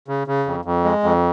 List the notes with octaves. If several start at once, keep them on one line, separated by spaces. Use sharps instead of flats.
C#3
C#3
F2
F2
G#3
F2